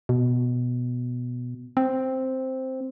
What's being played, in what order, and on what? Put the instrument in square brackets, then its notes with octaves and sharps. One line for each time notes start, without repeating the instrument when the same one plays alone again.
[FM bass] B2
C4